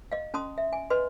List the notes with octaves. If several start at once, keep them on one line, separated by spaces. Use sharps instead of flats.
D#5 F5
C#4 A5 C6 D#6
E5
G#5
B4 D#5 C6